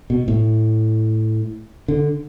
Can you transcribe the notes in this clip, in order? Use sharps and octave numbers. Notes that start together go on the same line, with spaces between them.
B2
A2
D3